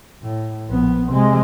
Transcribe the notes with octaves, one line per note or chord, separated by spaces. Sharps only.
A2
A#1 B3
C3 G#3